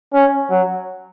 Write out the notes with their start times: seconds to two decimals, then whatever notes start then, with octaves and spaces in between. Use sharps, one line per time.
0.13 C#4
0.50 F#3